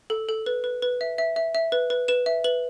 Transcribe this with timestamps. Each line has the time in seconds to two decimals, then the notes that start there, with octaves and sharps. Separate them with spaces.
0.10 A4
0.29 A4
0.46 B4
0.64 B4
0.82 B4
1.01 E5
1.18 E5
1.36 E5
1.55 E5
1.72 B4
1.90 B4
2.08 B4 E7
2.26 E5
2.44 B4 F#7